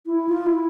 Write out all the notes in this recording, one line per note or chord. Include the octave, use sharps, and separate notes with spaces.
E4
F4
E4